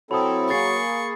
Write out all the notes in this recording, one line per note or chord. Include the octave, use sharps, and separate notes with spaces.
F#3 C4 E4 A4 B5 D#6
A#3 G#4 C#6 A6 C7